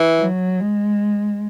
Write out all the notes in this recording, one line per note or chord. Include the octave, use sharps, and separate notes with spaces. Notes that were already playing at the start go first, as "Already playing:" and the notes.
Already playing: E3
F#3
G#3